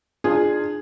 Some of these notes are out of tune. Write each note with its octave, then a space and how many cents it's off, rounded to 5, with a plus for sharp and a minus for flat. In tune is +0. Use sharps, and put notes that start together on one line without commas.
D4 +30 F4 +0 G#4 +0